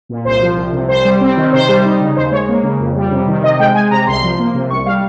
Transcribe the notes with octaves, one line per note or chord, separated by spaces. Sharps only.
A#2
C2 C5
F3
C2
C3
C2 C5
G3
C4
D#3
C3 C5
G3
D#4
C#3
D#2 C5
G#3 C#5
A#3
C#3
F2
G3
C3
D#3
C3 D#5
G#3 G5
G#3 G#5
C3 A#5
C2 C6
F3
A#3
C3
C2 C#6
G3 F5